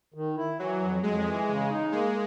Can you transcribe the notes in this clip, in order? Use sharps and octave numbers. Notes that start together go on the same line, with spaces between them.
D#3
E4
E3 F#3
F2
F2 G#3
E3
C#3
D#4
G#3 A#3